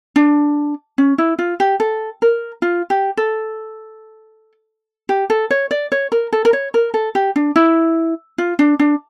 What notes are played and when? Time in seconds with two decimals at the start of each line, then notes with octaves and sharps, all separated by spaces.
0.16 D4
0.98 C#4
1.18 E4
1.39 F4
1.60 G4
1.80 A4
2.22 A#4
2.62 F4
2.90 G4
3.17 A4
5.09 G4
5.30 A4
5.51 C#5
5.71 D5
5.92 C#5
6.12 A#4
6.33 A4
6.45 A#4
6.53 C#5
6.74 A#4
6.94 A4
7.15 G4
7.36 D4
7.56 E4
8.38 F4
8.59 D4
8.79 D4